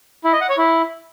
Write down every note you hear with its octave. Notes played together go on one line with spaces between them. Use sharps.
E4
D#5
F#5
C#5
E4